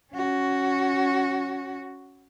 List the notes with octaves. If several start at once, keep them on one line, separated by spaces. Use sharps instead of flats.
C#4 F#4